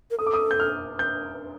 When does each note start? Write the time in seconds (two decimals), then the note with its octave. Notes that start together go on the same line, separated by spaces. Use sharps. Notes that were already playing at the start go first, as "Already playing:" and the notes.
0.11 A#4
0.19 A4 D#6
0.27 D6
0.34 D#6
0.51 G6
0.60 F6
0.99 G6